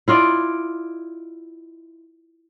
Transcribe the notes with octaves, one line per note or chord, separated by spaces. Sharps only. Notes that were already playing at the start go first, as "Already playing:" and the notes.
E4 F4 D5 D#5